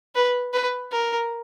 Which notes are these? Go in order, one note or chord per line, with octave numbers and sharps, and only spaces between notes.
B4
B4
A#4